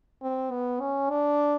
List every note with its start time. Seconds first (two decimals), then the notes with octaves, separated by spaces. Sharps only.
0.22 C4
0.51 B3
0.81 C#4
1.10 D4